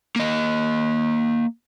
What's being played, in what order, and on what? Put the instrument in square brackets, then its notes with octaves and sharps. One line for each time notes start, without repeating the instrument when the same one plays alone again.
[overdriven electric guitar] A#3 D#5